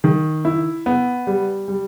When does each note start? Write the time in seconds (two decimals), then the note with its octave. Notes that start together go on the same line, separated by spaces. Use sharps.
0.04 D#3
0.45 E4
0.86 B3
1.27 G3
1.68 G3